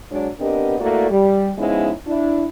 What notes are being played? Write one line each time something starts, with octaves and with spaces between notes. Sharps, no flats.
F#3 G#3 D4 C#5
B3 C4 D4 G4 A#4 D#5
A3 A#3 E4 F#4 D5
G3
F3 G#3 B3 C#4 D#4 E4
D4 E4